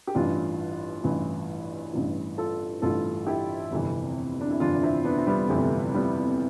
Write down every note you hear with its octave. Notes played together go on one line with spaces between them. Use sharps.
G4
A1 G2 E3 D4 F4
A1 G2 E3
A1 G2 E3
F4 A4
A1 G2 E3 F4 A4
E4 G4
G1 F2 C3 E3
D4
E4
G1 F2 C3 E3 D4 F4
D4
C4 E4
B3 D4
C4
G3 B3
G1 F2 C3 E3 A3
G3 B3